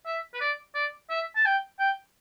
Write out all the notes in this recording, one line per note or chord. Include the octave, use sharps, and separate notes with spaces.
E5
B4
D5
D5
E5
A5
G5
G5